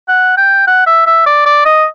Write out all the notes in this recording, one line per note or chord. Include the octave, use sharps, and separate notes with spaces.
F#5
G5
F#5
E5
E5
D5
D5
D#5